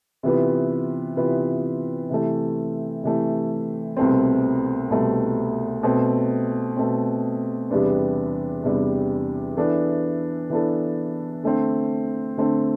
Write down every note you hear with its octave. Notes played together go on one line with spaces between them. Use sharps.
C3 E3 B3 F4 B4
C3 E3 B3 F4 B4
C3 E3 A3
C3 E3 A3
C2 B2 A3 C4
C2 B2 A3 C4
B2 A3 C4
B2 A3 C4
E2 C3 G3 B3 D4
E2 C3 G3 B3 D4
E3 B3 D4 A4
E3 B3 D4 A4
D3 A3 C4
D3 A3 C4